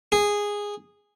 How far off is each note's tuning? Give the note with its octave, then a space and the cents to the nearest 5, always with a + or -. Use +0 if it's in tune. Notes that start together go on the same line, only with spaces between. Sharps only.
G#4 -10